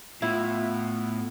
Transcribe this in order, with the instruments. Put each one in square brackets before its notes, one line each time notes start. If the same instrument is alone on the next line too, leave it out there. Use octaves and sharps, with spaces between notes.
[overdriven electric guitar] A2 [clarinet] B3 [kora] E4 [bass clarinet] F4